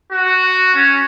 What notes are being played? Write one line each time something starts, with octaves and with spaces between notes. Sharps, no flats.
F#4
C#4